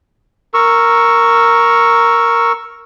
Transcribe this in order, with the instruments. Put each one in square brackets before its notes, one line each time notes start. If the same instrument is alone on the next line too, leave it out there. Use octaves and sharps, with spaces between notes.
[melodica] A#4 C#6 E6